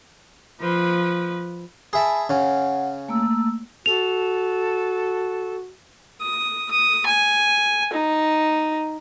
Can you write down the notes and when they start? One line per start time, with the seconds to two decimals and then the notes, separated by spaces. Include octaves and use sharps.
0.60 F3 B4
1.93 G#4 E5 G#5 A5 B5
2.29 C#3 C#4 F#5
3.08 A3 A#3 E6
3.86 F#4 A4 F7
6.22 D#6
6.71 D#6
7.06 G#5
7.93 D#4